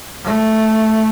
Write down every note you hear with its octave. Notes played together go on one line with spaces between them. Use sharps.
A3